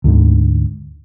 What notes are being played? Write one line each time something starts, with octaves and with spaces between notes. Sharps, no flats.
D2 G#2 D3